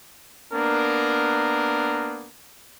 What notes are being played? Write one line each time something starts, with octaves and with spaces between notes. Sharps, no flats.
A#3 B3 D4 A#4